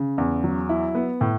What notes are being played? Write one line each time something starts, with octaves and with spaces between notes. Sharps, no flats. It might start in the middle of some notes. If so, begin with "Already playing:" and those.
Already playing: C#3
E2
F#3
E4
B3
A2